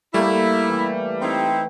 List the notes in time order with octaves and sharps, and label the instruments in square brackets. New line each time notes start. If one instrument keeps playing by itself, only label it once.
[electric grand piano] G3 [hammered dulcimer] A3 A#3 [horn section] E4
[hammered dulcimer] E3
[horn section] C4 D#4 E4 [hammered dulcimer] B4 G5